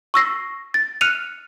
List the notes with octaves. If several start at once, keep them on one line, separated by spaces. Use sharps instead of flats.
C#6 E6 A#6 C7
A6
F6 F#6 C#7 D#7 F7